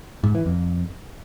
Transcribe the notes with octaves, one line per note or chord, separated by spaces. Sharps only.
G#2
E3
F2